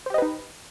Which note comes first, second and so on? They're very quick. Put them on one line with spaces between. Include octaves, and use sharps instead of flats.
C5 G4 D#5 B4 D#4